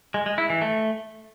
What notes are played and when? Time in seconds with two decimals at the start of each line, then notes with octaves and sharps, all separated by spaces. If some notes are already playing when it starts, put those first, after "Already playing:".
0.14 G#3
0.26 G#3
0.38 E4
0.50 E3
0.62 A3